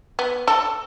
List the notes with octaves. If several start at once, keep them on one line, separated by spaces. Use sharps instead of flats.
B3
A4